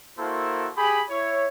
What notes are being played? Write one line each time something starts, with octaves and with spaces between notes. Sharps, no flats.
A#3 E4 F#4 A4 A#4 C5
G4 G#4 G#5 B5
E4 C#5